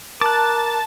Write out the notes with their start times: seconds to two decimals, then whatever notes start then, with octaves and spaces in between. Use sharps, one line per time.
0.21 A#4 A5 D6 F#6